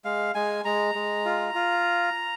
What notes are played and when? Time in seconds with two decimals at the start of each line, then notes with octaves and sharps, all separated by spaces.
0.05 G#3 F5
0.35 G#3 G#5
0.65 G#3 A#5
0.95 G#3
1.25 F4
1.55 F4